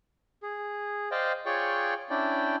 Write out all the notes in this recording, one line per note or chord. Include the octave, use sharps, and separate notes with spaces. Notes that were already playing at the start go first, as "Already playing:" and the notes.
G#4
C5 D5 D#5 F5 G5
F4 G#4 C#5 D5 G5 C#6
C#4 D4 E4 D5 G5